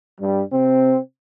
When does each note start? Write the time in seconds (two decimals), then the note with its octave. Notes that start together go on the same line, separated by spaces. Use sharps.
0.19 G2 G3
0.51 C3 C4